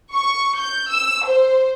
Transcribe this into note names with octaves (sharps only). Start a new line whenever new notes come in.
C#6
G6
E6
C5